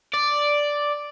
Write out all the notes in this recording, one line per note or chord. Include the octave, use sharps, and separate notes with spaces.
D5